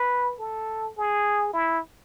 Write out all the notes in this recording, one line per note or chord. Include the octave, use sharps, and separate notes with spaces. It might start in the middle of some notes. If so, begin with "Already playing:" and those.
Already playing: B4
A4
G#4
E4